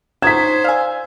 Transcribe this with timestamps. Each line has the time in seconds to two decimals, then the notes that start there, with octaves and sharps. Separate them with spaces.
0.22 F#3 D#4 C5 D#6 G#6 B6 E7
0.64 D5 F5 G#5 E6